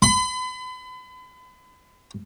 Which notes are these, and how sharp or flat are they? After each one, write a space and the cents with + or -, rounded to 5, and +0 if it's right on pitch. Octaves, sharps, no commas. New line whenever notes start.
B5 +40